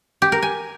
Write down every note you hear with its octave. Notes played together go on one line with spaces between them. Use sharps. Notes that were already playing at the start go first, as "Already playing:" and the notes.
G4
A#4
G#5